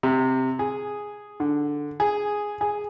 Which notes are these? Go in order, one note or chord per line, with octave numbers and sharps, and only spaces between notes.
C3
G#4
D3
G#4
G#4